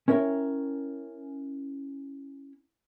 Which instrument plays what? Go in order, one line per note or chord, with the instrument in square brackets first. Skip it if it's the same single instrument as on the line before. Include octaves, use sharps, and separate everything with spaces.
[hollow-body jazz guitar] C#4 E4 A#4 C#5 G5